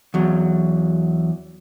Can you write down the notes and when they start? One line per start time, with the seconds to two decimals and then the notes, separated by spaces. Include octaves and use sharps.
0.14 E2 F#3